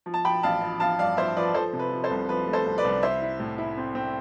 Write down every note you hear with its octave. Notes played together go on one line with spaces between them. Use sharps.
F3
A5
F3 G5 B5
A1 F5 A5
F3
F3 F5 A5
G2 D5 F5
F3 C5 E5
F3 B4 D5
F3 A4 C5
C3
B4
F3
A4 C5
C2
F3 B4
A3
A4 C5
C2
B4 D5
C2
E4 C5 E5
E4
A2
E4
C4
C4